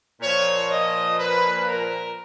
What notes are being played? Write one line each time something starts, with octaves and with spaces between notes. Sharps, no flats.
A#2 F3 C#5
D#5
B4
A#4